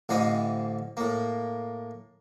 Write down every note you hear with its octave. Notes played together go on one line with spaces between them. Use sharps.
A1 D3 E3 C4 D#5 F5
A2 A#3